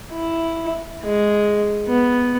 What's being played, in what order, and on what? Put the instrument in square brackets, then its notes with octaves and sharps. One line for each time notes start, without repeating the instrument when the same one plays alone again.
[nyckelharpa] E4
G#3
B3